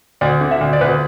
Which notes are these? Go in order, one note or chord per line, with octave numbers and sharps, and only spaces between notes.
D2 D5
D3
E5
D2
D5
D2 B4